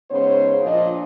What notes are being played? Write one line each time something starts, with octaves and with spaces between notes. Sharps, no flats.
G#2 C#3 B3 C5 C#5
A#2 F3 D4 F4 D#5